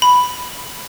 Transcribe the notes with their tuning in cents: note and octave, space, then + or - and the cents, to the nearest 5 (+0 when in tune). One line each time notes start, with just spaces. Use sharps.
B5 +5